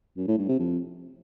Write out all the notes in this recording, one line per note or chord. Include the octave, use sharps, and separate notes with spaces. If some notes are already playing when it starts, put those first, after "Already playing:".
F#2
A2
G2
C3
F2